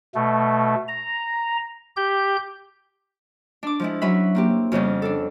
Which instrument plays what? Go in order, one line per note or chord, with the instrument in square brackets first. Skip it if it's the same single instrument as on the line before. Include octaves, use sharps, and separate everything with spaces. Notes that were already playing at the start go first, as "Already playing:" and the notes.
[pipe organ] B2 A3
A#5
G4 G6
[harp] D4 D6
F3 G#3 E4
F#3 C#4 F#4 E5 B5
A#3 C4 G4
F2 C#3 G3 B3 C#4
D4 A4